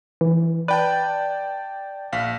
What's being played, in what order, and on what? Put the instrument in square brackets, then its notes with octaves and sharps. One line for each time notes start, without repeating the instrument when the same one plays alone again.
[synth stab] E3
[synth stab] B4 [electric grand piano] D5 G5 A5
[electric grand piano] A#1 F5 B6